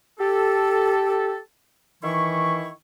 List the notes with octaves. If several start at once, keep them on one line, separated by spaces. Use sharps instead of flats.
G4 A4
D#3 E3 E4 C#6